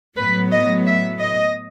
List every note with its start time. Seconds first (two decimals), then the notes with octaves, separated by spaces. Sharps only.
0.17 A2 F#3 B3 B4
0.52 D#5
0.86 E5
1.20 D#5